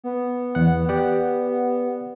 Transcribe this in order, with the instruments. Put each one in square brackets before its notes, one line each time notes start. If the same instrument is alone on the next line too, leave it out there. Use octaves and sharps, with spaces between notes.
[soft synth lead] B3
[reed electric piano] E2 F#5
G4 D5 F#5